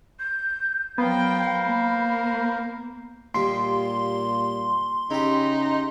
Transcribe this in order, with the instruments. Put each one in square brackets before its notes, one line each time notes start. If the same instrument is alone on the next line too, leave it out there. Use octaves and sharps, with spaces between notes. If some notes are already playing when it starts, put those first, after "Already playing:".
[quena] G6
[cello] F#3 G5 [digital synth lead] B3 [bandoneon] A#4 C5 F5 [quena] B5
[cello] A#3
[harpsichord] D#2 G3 A#3 [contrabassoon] A#2 [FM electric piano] C6
[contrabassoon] C#3 [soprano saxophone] D#4 [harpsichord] E4 G4